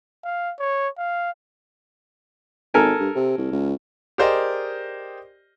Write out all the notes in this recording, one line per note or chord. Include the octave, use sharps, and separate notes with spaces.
F5
C#5
F5
G#1 A4 A#4 G#5
G2
C3
C2
C#2
G4 G#4 A#4 C5 D5 D#5